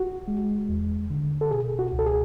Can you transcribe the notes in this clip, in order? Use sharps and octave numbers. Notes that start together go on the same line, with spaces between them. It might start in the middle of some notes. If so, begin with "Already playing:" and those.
Already playing: F#4
G#3
E2
D3
A4
B2 G#4
F#4
C#2
A4
G#4